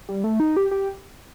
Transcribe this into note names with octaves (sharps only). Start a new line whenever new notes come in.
G3
A3
D#4
G4
G4